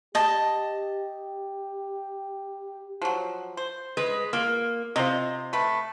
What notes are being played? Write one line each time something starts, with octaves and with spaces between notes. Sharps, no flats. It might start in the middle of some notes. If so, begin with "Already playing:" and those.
G4 D#5 A5
F3 F#3
C5
G#3 B4
A#3 F4
C3 F4 C5 D#5
A3 B4